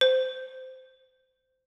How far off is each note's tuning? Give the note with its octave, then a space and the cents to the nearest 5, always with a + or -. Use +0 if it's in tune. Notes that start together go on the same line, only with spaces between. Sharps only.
C5 -15